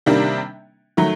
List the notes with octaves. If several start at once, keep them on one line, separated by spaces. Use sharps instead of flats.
C3 D#3 G3 A#3 D4
D#3 F#3 A3